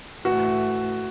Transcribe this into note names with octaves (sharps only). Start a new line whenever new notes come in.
A2 E3 A3 F#4